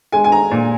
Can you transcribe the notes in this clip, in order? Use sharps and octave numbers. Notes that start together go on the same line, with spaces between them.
G#3 G#5
G#5
A#5
A#2